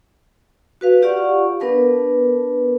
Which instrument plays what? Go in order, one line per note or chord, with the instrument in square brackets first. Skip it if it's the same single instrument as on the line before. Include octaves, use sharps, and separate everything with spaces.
[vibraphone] F#4 B4 F5
F4 G4 D5 F5 F#5 C#6
B3 D4 A#4 B4 A5